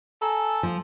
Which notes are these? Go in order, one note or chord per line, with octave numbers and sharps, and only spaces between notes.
A4 G#5 A#5
F3 F4